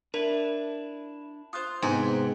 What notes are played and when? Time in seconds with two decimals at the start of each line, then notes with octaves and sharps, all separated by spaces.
0.14 D4 E4 A#4
1.53 F4 C5 D#6 F#6
1.82 G#2 C3 B3 C4 G5 G#5 C6